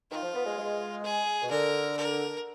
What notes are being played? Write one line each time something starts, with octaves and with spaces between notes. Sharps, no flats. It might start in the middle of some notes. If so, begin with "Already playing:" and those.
D#3 F4
F3
B3
G#3
G#3
G#4
B2
D3 A#4
A#4